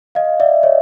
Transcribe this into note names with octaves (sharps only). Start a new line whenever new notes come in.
D#5 F5
D5 E5
C#5 D#5